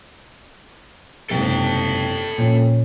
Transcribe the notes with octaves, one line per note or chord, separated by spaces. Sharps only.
F#1 G#2 C3 A4 G5
A#2 C#4